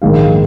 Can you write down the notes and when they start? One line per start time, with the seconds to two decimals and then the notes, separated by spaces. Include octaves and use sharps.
0.02 A#1 G#2 D#3 G#3 F5